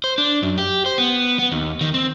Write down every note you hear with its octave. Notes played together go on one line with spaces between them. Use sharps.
C5
D4
F#2
G4
C5
B3
B3
D#2
D#3
C4